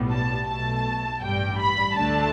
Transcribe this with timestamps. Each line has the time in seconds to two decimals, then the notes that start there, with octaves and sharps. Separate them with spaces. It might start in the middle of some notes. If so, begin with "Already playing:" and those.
Already playing: B1 A2 G3 B3
0.12 A5
0.48 B1 B2 A3 A5
1.22 A1 G2 G3 G5
1.58 B5
1.96 D2 D3 A3 D4 A5